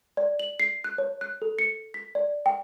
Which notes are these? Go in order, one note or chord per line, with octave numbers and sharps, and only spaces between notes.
D5
F#7
C7
F#6
C#5
F#6
A4
C#7
B6
D5
G5